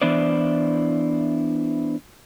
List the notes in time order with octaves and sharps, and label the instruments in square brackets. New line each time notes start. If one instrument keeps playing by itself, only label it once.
[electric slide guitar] E3 B3 D4 E4 C5 D5